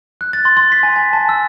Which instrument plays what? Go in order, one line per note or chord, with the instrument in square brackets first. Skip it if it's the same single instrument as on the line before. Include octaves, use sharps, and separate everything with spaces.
[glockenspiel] F#6
A6
C6
C6
B6
G#5
G#5
A5
E6